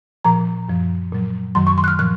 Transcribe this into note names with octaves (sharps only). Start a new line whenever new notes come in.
A#2 F3 A#5
F#2 F3
A#2 F#3
F#2 D#3 F#3 C6
C#6
C6
F#6
F6
A#2 F3 F#6